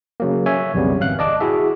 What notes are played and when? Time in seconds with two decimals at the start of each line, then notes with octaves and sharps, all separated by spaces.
0.20 C#3 F#3 A#3
0.46 C#5 E5 G#5
0.74 B1 F2 C#3 G3 B3
1.01 G#1 F5 F#6
1.19 D5 D#5 A5 D6
1.40 E4 F#4 G#4 E5